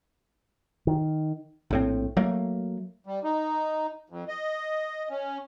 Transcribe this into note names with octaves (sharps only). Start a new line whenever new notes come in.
D#3
A#1 A2 C4
F#3 A3 A#3
G3
D#4
F2
D#5
C#4